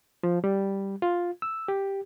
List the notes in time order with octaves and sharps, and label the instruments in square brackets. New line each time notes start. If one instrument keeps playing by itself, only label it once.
[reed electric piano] F3
G3
F4
E6
G4